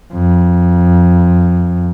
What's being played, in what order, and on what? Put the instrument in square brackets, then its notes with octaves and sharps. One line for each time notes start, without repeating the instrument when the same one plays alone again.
[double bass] F2